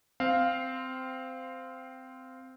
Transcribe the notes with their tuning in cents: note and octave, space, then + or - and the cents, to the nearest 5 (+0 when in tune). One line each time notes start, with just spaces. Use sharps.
C4 -15 F5 +0